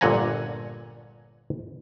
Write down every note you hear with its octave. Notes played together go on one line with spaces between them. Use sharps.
G1 A#2 D3 F#5 G#5 A#5